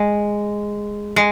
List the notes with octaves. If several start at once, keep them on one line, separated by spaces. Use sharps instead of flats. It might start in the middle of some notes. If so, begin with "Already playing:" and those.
Already playing: G#3
G#3